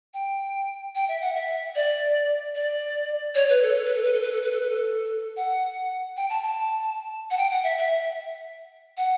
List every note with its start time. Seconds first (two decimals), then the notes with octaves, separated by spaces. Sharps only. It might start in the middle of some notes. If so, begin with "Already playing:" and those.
0.14 G5
0.95 G5
1.08 E5
1.21 F#5
1.35 E5
1.75 D5
2.55 D5
3.35 C#5
3.49 B4
3.63 A4
3.75 A4
3.85 B4
3.94 A4
4.03 B4
4.13 A4
4.22 B4
4.31 A4
4.42 B4
4.51 A4
4.60 B4
4.69 A4
5.37 F#5
6.17 G5
6.30 A5
6.44 A5
7.31 F#5
7.37 G5
7.50 F#5
7.64 E5
7.78 E5
8.97 F#5